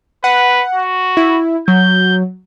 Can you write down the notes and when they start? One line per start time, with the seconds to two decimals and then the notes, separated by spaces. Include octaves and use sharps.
0.24 B4 F#5
0.75 F#4
1.17 E4
1.68 F#3 G6